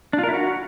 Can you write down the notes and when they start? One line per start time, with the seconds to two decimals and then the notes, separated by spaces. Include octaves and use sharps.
0.13 D4
0.18 F4
0.24 A#4
0.29 E4
0.34 F#4